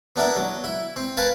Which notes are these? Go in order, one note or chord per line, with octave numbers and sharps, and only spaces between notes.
B3 D4 E4 A#4
F#3
E4
C4
A#4 B4 F5 G#5 A5